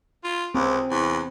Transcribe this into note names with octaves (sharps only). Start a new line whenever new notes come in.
F4
C#2 C4
E2